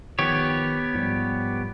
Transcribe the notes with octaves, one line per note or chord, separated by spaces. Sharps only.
D#3 F3 B3 G4 C#5
G#2 F3 G3